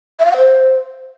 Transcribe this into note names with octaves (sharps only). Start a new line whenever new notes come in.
E5
F5
F#5
C5